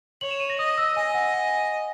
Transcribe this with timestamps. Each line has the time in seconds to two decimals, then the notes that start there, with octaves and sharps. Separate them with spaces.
0.21 C#5 F#7
0.31 E7
0.40 D#7
0.50 A#6
0.59 D#5 D#6
0.78 E6
0.97 D#5 G#5
1.14 F#5
1.34 G#5